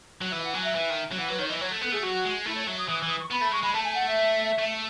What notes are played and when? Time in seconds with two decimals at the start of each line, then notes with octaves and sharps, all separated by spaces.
0.21 F#3
0.32 E3 E5
0.44 F#5
0.54 F#3 G#5
0.65 E5
0.75 E3
0.90 D#3
1.12 F#3
1.18 E3 F#5
1.28 F#3 B4
1.39 D#3 C#5
1.49 E3 D#5
1.60 F#3 C#5
1.71 A3
1.82 B3 A4
1.92 A3 G#4
2.03 F#3 F#4
2.25 G#3
2.46 A3 E4
2.56 C#5
2.67 F#3 E5
2.78 D#6
2.88 E3 D#6
2.99 E6
3.03 E3
3.09 D#6
3.21 C#6
3.30 B3 B5
3.41 A3 B5
3.52 G#3 C#6
3.63 G#3 B5
3.73 A3 A5
3.84 G#5
3.95 F#5
4.06 E5
4.58 A3